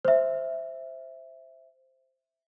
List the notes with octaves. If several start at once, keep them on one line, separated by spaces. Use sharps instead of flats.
C5 E5